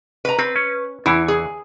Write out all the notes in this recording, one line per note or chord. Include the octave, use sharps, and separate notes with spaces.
B4 A#5
C4 B4
C#4
E2 E3 E4
G#4